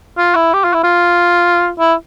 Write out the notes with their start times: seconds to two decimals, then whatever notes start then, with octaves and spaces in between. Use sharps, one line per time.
0.18 F4
0.35 E4
0.54 G4
0.64 F4
0.74 E4
0.84 F4
1.80 E4